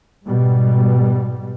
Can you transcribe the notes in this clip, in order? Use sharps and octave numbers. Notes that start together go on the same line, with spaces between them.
G#2 B2 G3